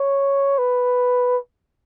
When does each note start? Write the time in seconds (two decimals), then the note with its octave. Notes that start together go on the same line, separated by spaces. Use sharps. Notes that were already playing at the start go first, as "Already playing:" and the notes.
Already playing: C#5
0.59 B4